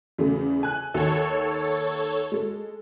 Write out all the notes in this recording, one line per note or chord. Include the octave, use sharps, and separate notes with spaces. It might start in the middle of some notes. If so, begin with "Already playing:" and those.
E2 C#3 A3
G#5 F#6
D#2 A4 C#5
G#3 A4